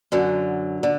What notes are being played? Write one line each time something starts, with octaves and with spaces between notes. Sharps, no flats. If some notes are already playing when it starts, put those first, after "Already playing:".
F#2 D3 F#3
D3